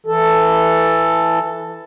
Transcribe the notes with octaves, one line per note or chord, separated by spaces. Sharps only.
E3 A4